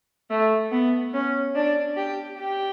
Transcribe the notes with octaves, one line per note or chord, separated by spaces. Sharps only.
A3
B3
C#4
D4
G4
G4